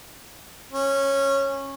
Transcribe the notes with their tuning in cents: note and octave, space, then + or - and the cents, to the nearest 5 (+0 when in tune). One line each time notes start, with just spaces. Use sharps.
C#4 -15